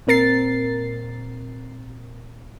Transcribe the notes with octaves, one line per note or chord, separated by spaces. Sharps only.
A#2 C4 A#4 A6 C7